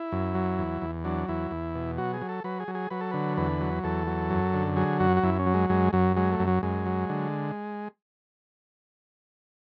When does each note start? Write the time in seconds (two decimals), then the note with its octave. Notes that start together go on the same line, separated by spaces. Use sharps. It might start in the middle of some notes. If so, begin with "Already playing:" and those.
Already playing: E4
0.12 F#2
0.35 F#3
0.59 E2
0.82 E2
1.05 F#3 D4
1.28 E2 E4
1.51 E2
1.75 B2
1.98 F#3 F#4
2.13 G#4
2.21 F#3
2.29 A4
2.44 F#3 B4
2.60 G#4
2.68 F#3
2.75 G#4
2.90 F#3 B4
3.01 A4
3.11 D3 B4
3.37 E2 B4
3.61 F#3
3.84 E2 A4
4.07 F#3
4.30 F#2
4.54 D3
4.77 F#3 G#4
5.00 F#2 F#4
5.17 F#4
5.23 F#2 E4
5.39 C#4
5.46 F#3
5.54 G#3
5.69 F#2 G#3
5.93 F#2 F#3
6.16 F#3 G#3
6.32 A3
6.39 F#2
6.47 F#3
6.63 F#2 G#3
6.86 F#3
7.09 D3